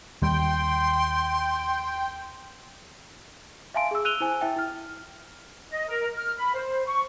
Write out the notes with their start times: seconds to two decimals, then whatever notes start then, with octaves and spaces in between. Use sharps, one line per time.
0.22 D#2 D#3 G3 G5 C6
3.74 E5 F5 G#5 A5 C6 D7
3.91 G#4 E6
4.05 E6 F#6 D#7 F7 G7
4.20 E4 C5 G#5
4.41 E4 E5 G5
4.56 E4 F6
5.70 D#5
5.88 A#4
6.15 F6
6.37 B5
6.54 C5
6.85 C#6